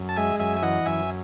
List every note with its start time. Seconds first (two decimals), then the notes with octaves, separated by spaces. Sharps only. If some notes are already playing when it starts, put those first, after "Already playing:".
Already playing: F#2
0.09 A5
0.16 G#3 E5 G#5
0.39 F#2 E5 G#5
0.57 G#5
0.63 E3 D#5 F#5
0.86 F#2 E5 G#5